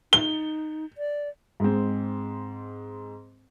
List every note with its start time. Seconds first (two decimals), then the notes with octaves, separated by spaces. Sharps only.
0.13 D#4 G7
0.98 D5
1.60 G#2 G#3 C4